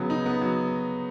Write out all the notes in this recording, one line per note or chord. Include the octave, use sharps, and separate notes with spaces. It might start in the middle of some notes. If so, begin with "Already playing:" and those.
Already playing: C#3 F#3 B3
D#4
B3
F#3